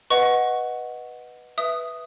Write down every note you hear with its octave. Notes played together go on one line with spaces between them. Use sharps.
B4 D#5 F#5 C#6
B4 E5 D#6